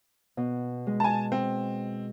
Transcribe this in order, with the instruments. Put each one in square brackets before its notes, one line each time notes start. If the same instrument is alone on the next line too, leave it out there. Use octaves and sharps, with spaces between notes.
[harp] B2
G#3
[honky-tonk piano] G#5 A5
C4